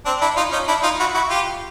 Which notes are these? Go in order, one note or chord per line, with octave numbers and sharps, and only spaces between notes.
C4 D4
D4 E4
D#4 F4
C#4 D#4
D4 E4
D#4 F4
E4 F#4
E4 F#4
F4 G4